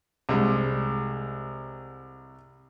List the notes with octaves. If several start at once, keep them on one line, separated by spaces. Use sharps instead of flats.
C2 G#3